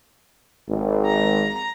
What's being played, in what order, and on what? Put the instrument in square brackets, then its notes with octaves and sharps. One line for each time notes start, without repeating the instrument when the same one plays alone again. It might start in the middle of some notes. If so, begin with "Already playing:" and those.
[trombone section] G#1
[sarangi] A#5